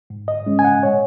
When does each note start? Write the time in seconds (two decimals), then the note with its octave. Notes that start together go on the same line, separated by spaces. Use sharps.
0.10 G#2
0.28 D#5
0.46 G#3 C#4
0.59 G#5
0.64 F#5
0.83 A#2 C#5